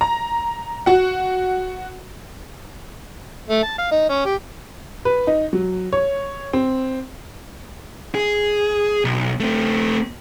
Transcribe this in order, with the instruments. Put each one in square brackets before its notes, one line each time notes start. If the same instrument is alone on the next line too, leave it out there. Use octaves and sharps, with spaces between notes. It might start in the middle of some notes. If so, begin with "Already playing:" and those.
[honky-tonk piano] A#5
F#4 F#5
[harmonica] A3
A5
F5
D#4
C#4
G4
[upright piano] B4
D#4
F#3
C#5
C4
[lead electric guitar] G#4
B1
A3 C4